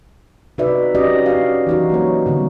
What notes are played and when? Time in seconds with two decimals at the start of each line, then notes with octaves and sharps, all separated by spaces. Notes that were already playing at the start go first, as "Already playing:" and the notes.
0.58 C3 D#4 F#4 B4 D5 E5
0.95 C#4 F#4 G4 D5 D#5
1.26 C#4 D4 F#4 G4 F5
1.67 E3 D#4 F#4
1.90 F#3 A#3 C#5
2.26 A#2 D3 G3 B3